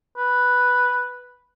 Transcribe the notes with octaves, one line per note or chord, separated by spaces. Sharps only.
B4